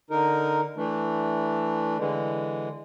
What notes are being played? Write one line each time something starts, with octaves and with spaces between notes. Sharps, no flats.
D3 D#4 A#4
E3 A3 D4
D3 E3 G#3